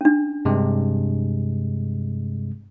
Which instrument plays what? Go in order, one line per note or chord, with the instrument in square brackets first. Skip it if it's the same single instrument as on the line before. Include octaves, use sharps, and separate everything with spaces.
[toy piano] C#4 D4
[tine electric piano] G2 C3 G#3